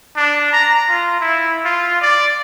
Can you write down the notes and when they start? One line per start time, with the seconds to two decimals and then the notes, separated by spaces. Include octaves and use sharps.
0.17 D4
0.53 A#5
0.89 F4
1.21 E4
1.65 F4
2.02 D5